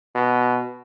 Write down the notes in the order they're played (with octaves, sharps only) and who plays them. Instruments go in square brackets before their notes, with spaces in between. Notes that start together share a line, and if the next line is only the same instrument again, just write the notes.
[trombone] B2